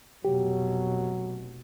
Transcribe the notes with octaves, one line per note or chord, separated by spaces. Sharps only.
F1 B2 F#3 G4